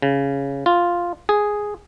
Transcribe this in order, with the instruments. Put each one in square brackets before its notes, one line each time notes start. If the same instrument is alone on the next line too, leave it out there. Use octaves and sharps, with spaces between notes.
[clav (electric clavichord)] C#3
F4
G#4